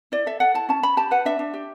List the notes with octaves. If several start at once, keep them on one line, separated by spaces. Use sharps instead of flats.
E4 D5
A4 E5
A4 F#5
E4 A5
C#4 A5
C#4 B5
G4 A5
B4 F#5
D4 E5
D4
G4